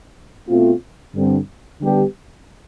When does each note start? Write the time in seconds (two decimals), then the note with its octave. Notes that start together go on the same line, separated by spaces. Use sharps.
0.49 B2 A3 C4 F4
1.15 G2 D3 G3 C4
1.80 D3 G3 B3 D4 G4